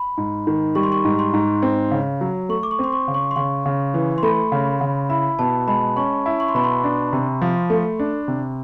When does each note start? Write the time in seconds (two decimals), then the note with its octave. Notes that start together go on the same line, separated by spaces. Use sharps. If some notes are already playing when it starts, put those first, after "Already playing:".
Already playing: B5
0.18 G#2
0.47 D#3
0.75 G3 C#6
0.83 C6
0.92 C#6
1.05 G#2
1.19 C6
1.33 G#2
1.63 C4
1.91 C#3
2.21 F#3
2.49 A3 C#6
2.63 D6
2.71 C#6
2.79 C4
2.84 C6
2.92 C#6
3.08 C#3
3.14 C#6
3.31 C6
3.36 C#3 C#6
3.66 C#3
3.94 E3
4.18 C6
4.23 A3 B5
4.52 C#3
4.81 C#3
5.09 E4 B5
5.39 B2 A5
5.68 G#3 B5
5.96 C#4 C#6
6.26 E4
6.40 C#6
6.48 C6
6.54 B2 B5
6.64 C6
6.84 D4
7.13 C3
7.42 F3
7.70 A3
7.99 D4
8.28 C3